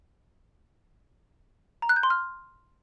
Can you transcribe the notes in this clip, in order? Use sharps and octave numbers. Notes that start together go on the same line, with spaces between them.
A#5
F#6
G6
C6
F6